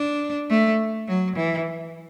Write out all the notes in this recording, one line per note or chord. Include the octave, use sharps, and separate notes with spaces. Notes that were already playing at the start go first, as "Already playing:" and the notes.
Already playing: D4
A3
F#3
E3